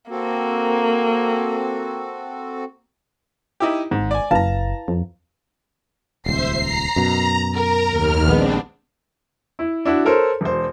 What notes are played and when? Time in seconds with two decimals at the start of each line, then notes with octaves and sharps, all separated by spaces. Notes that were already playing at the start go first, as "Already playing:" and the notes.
0.10 A#3 C4 F#4 A4
3.60 D#4 E4 G4
3.91 G#1 G#2
4.11 D5 G#5
4.31 F#1 E4 B4 F5 A5 A#5
4.88 F2
6.26 D#1 C#2 C5 E5 C7
6.58 A#5
6.96 F#2 B2
7.54 A#4 A#5
7.88 D#2 F6
8.28 A#1 D#2 G#3 B3 C4 D4
9.59 E4
9.85 D4 E4 F#4
10.05 A4 A#4 C5 C#5
10.41 E1 C5